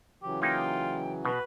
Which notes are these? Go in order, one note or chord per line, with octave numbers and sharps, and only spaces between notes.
C#3 E3 F#3 G4
A#3 D#4 F4 G5
B2 F#4 B4